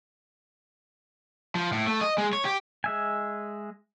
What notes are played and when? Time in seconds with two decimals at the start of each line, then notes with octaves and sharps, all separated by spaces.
1.55 F3
1.72 A2
1.87 A3
2.01 D#5
2.18 G#3
2.33 C#5
2.45 G4
2.84 G#3 E5 G#5